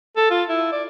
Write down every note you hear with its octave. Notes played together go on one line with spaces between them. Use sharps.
A4
F4
E4
D5